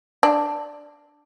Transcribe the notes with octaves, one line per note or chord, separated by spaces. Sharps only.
D4